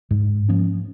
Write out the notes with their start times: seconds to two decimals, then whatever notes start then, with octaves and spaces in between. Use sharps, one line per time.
0.11 G#2
0.49 F3 A#3 C#4